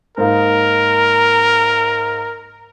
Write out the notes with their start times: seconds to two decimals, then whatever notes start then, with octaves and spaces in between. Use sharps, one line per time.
0.18 G#2 A#3 D#4 A#4